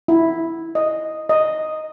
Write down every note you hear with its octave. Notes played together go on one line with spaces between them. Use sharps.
E4
D#5
D#5